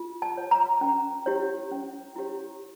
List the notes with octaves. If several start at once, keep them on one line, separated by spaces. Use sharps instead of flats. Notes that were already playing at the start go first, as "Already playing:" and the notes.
Already playing: F4
A5
C#5
A#5
C#4
E4 G4 C#5
C#4
E4 G4 C#5